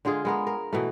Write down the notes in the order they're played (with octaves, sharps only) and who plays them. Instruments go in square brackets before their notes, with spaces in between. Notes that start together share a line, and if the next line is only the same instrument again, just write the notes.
[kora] D3 G#3 F4 G#4
G#3 B3 A#4
A#4
B2 E3 A3